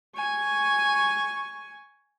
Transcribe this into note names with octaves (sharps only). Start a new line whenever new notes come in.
G#5 C#6